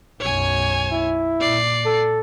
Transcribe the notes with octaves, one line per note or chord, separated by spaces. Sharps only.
B1 F#2 C#5 G#5
E4
A#2 D5 C7
A4